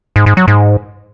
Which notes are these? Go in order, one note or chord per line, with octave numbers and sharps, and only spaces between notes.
G#2
G#2
F#3
G#2